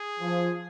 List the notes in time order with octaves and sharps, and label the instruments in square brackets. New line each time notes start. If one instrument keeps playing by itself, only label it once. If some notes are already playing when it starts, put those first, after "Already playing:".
Already playing: [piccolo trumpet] G#4
[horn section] F3